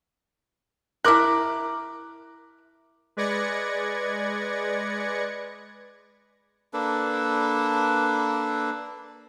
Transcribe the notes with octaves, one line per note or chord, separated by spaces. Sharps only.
E4 A#4 D6 F#6
G#3 B4 D5 G#6 A#6 C#7
A#3 D4 A4 B4